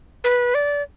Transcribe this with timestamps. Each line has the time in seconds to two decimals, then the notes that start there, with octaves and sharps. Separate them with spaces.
0.24 B4
0.55 D5